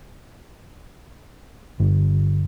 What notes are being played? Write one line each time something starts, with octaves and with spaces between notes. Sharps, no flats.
G1